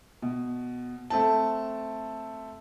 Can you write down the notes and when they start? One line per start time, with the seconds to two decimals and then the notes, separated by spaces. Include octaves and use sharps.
0.22 B2
1.10 A3 C4 A5